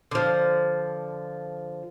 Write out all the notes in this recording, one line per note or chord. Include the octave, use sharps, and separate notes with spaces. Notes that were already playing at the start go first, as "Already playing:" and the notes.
D3 F3